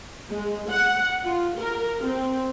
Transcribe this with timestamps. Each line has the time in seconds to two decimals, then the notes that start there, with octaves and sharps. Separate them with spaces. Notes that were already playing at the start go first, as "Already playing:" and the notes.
0.31 G#3
0.70 F#5
1.24 F4
1.58 A#4
2.06 C4